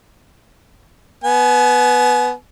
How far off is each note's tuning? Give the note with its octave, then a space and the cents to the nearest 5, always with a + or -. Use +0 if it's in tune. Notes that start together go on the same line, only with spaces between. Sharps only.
B3 +0 G#5 +40